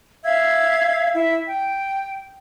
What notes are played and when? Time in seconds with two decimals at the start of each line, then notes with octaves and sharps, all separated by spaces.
0.23 E5 F5 E6 G#6
1.13 E4 E5
1.47 G5